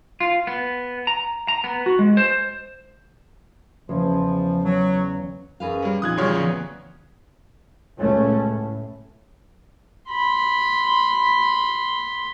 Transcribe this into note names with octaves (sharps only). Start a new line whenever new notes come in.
F4
B3
A#5
A#5
B3
F#4
G#3
C5
E2 C#3 F3
F#3
F#2 G#4 B4 F5
G3 C#4
F2 A#2 D#4 F4 D#6 F#6 G#6
F#2 C#3 E3 G3 C#5 F#5
D2 F3 B3
C#2 A#2 A3 C#4
A2
B5 C6